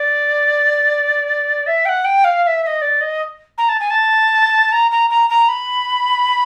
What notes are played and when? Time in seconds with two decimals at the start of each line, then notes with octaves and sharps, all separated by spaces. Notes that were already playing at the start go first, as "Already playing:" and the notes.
Already playing: D5
1.66 E5
1.85 G5
1.88 F#5
2.04 G5
2.24 F5
2.43 F5
2.46 E5
2.62 E5
2.66 D#5
2.81 D5
3.00 D#5
3.57 A#5
3.68 A5
3.79 G#5
3.90 A5
4.72 A#5
4.91 A#5
5.09 A#5
5.29 A#5
5.48 B5